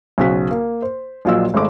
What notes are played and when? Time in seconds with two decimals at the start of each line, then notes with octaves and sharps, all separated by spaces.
0.18 B1 C#3 F#4 C5 B6
0.51 A#3
0.82 C5
1.25 A#1 A#2 F#3 F4 D#5 E6
1.54 G#1 G#3 A3 D6